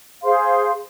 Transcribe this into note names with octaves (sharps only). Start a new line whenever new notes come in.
G#4 C5 F5 C6